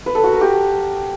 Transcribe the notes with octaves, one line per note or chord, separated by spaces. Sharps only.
B4
A4
F#4
A#4
G4